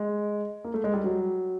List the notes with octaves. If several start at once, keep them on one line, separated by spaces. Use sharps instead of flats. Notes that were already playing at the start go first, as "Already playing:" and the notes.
Already playing: G#3
A#3
A3
G#3
G3
F#3